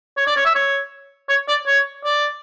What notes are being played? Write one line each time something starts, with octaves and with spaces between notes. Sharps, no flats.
C#5
D5
C#5
E5
C#5
C#5
D5
C#5
D5